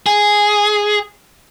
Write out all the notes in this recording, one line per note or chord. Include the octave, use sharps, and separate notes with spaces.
G#4